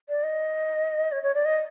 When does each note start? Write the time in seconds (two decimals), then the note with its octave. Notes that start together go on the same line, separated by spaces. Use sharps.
0.09 D5
0.23 D#5
1.12 C#5
1.23 C#5
1.35 D5
1.45 D#5